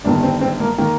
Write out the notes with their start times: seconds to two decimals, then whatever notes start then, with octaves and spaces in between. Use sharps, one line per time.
0.04 G1 G2 D#3 A#3 D4
0.23 C4
0.41 C4
0.60 A#3
0.78 D#3 A#3